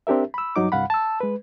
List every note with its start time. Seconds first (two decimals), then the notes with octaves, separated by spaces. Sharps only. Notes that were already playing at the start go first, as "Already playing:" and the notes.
0.07 C4 D4 G4 A#4 E5
0.34 B5 E6
0.56 G2 F#3 D#4 D6
0.72 C2 G2 F5 F#5 B5
0.90 A5 E6
1.20 G#3 B4